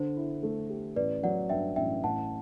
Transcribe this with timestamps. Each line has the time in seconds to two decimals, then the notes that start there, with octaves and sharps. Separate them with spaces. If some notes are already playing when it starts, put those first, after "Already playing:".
Already playing: D3 C5
0.16 E4
0.43 A3
0.70 G4
0.96 A1 B4 D5
1.23 F#3 D5 F#5
1.49 G2 E5 G5
1.76 A1 E5 G5
2.03 A1 F#5 A5